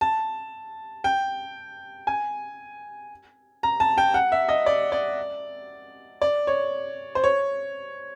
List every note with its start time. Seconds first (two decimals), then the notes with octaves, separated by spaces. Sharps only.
0.01 A5
1.04 G5
2.07 G#5
3.63 A#5
3.80 A5
3.98 G5
4.14 F#5
4.32 E5
4.49 D#5
4.66 D5
4.92 D5
6.22 D5
6.47 C#5
7.15 C5
7.24 C#5